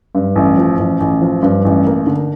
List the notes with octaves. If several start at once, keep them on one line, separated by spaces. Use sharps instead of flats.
G2
A1
F3
A1
A1
F3
G2
A1
A#3
D3